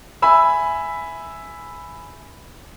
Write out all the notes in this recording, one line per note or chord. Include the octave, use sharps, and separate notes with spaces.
E5 G#5 B5 E6